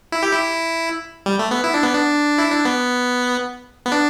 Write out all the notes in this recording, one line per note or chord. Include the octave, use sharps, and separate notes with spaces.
E4
G4
E4
G3
A3
B3
E4
D4
B3
D4
E4
D4
B3
B3
D4